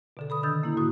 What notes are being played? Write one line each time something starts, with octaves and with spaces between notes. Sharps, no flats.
B2 D3 A4
A4 B5 D#6
D#3 D4 D#6 E6 G6 A6
A#3 C#4 E4
A2 D#3 F#4 D#6